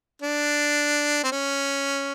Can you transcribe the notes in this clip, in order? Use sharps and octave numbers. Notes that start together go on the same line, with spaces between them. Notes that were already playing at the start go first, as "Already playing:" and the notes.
D4
C4
C#4